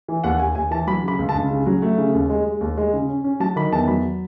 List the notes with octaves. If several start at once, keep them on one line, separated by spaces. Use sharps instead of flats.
E3
D#2 F#5
D#2 G#5
D#2 G#5
E3 A5
F#3 B5
C#3
B5
C#2
A5
C#2
C#3
F#3
A3
C#3
D#2
G#3
G#3
D#2
G#3
C#3
C#4
C#4
F#3 A5
D#3 B5
E2 A5
F#3 B5